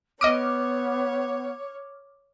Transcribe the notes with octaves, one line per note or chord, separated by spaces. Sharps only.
B3 C#5 D#5 D6 D#6 F6 D7